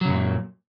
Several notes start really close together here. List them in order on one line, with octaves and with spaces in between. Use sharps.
F#3 C#3 F#2 A#2